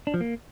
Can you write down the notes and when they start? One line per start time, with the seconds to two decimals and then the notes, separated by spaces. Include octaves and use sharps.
0.07 D4
0.14 F3
0.21 A#3